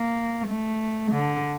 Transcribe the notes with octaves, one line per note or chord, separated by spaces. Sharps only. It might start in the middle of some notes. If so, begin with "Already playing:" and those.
Already playing: A#3
A3
D3